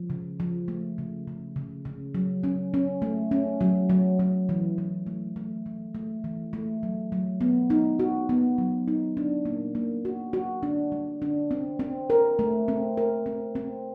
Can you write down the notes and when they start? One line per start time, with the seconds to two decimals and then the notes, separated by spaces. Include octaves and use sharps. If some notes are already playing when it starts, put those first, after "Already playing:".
Already playing: F3
0.10 C#3
0.40 F3
0.68 A3
0.98 C#3
1.28 C#3
1.56 C#3
1.85 C#3
2.15 F#3
2.44 C#4
2.74 C#4
3.02 A3
3.31 C#4
3.61 F#3
3.90 F#3
4.19 F#3
4.49 E3
4.78 E3
5.07 A3
5.36 A3
5.66 E3
5.95 A3
6.24 E3
6.53 A3
6.83 F#3
7.12 F#3
7.41 B3
7.70 D#4
7.99 F#4
8.29 B3
8.58 F#3
8.88 D#4
9.17 D4
9.45 A#3
9.75 A#3
10.05 F#4
10.33 F#4
10.63 D4
10.92 G3
11.22 D4
11.51 C4
11.79 C4
12.10 A#4
12.39 A3
12.68 C4
12.97 A#4
13.26 C4
13.55 C4